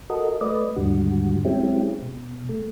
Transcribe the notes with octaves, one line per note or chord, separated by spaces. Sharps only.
F#4 A4 A#4 D#5
A3 B4 D5 D#5
D#2 G#2 D3 G3 F#4
F#3 G#3 C4 C#4 E4 G4
B2
A3